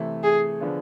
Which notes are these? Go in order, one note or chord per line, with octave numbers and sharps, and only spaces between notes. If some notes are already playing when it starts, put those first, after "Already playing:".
Already playing: C3 E3 A3
G#4
D3 F3 B3 D4 F4